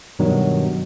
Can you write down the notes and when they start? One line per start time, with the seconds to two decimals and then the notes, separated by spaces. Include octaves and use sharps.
0.19 G2 B2 D#3 F#3